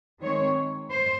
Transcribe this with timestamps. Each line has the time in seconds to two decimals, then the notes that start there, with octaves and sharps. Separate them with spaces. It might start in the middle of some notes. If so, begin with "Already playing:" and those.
0.21 D#3 G#3 C4 C#5
0.89 C5